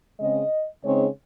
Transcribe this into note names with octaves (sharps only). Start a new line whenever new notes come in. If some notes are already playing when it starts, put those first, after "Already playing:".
C#3 G#3 C4 D#5
C#3 G#3 C4 D#4 C#5